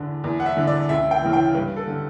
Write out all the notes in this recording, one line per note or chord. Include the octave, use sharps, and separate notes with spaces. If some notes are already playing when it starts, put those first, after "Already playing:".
Already playing: E2 D3
E2
F#5
E5
D3
D5
C#2 E5
G5
C#3 E3
G5
G2 B4
A4
D3